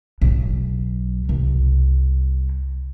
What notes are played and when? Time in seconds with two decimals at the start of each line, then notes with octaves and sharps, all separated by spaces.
0.22 B1
1.29 C2